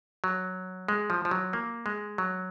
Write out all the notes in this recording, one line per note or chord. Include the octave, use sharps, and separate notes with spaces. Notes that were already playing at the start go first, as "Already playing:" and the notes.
F#3
G#3
F3
F3
F#3
A#3
G#3
F#3